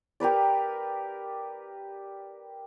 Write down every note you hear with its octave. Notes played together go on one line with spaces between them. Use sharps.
G4 A#4 B4 D5